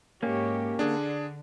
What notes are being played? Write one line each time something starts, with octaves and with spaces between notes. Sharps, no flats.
G#2 A#3 C#4 G4 C#5
D3 D4 G#4